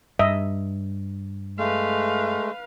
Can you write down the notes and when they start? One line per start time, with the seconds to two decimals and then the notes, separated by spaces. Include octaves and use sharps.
0.19 G2 D#5 E5
1.58 G#3 A3 B4 F5